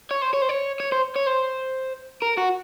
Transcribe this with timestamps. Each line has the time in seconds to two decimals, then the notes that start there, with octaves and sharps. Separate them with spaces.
0.11 C#5
0.22 C5
0.33 C#5
0.42 C5
0.49 C#5
0.80 C#5
0.92 C5
1.16 C#5
1.27 C5
2.22 A#4
2.38 F#4